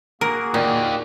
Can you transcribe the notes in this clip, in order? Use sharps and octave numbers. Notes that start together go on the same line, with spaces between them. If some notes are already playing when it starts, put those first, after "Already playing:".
A#3 F#4 G#4 A#4
A#2 D#4 G4